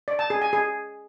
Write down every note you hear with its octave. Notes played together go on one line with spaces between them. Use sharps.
D5
A5
G#4
G#5
G#4